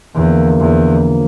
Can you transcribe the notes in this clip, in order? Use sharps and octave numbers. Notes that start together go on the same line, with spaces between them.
E2 D3 F3 A#3
E2